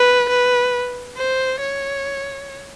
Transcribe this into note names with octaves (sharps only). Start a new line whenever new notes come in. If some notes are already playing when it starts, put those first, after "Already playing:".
Already playing: B4
B4
C5
C#5